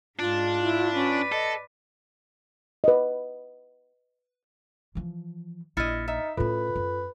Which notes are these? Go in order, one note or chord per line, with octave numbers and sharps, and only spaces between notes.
G#2 G#3 D4 F4
E4
C#4 B4 D5
A4 D#5
B4 D#5
E3 F3
A#1 E4 D#5 F6 A6 C#7
D#4 E5
A2 C#4 F4 A4 B4
F#2